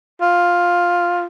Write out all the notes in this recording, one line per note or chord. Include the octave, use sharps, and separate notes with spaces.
F4